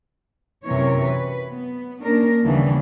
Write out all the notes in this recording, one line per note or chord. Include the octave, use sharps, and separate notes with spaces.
F#2 C3 E3 A#4 C#5
B4
B3
A#3 C#4 D4 A#4
D#2 C#3 E3 G3 B3 D4